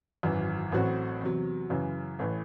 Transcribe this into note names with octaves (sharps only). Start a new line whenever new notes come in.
G#1 F#2 E3
A1 A2 F#3 C4 F#4
E2 C3 F#3
F#2 C#3 E3
A1 A2 E3